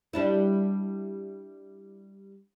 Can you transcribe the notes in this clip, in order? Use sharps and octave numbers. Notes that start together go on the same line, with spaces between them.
G3 D4 E4